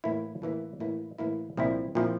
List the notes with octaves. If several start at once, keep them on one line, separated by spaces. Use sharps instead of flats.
A2 E3 A#3 E4
A2 E3 A#3 E4
A2 E3 A#3 E4
A2 E3 A#3 E4
C2 A#2 F3 C4 E4
A#2 F3 C4 E4